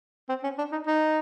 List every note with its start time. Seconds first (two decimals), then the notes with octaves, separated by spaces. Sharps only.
0.29 C4
0.44 C#4
0.58 D4
0.72 D#4
0.86 D#4